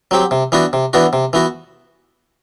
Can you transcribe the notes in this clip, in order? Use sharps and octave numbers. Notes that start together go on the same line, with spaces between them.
F#3 C4 G4
C3
E3 B3 D4 F#4
C3
E3 B3 D4 F#4
C3
E3 B3 F#4